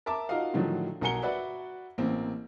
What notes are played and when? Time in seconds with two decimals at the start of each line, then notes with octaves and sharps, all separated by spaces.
0.06 A#4 E5 A5 D6
0.29 D#4 F4 F#4 A#4 D#5 F5
0.54 A2 D3 D#3 F3 F#3
1.01 B1 F#4 A#4 G#5 C#7 G7
1.22 F#4 B4 D5 E5 F#5
1.98 A1 A#3 C4